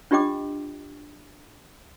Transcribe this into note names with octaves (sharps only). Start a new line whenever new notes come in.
D4 F4 G4 D#5 G5 D6